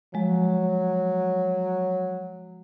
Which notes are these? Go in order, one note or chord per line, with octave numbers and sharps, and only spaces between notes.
F3 F#3 G#3